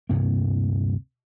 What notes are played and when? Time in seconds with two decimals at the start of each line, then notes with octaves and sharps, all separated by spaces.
0.09 D2 G2 C3 A#3